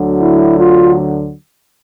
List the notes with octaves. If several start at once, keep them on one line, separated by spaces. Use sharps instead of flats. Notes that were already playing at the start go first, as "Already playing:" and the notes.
Already playing: D2 D3 F#3
E4
F4